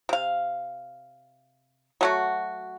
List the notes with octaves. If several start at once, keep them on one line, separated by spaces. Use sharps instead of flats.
C3 F5
F#3 A3 F#4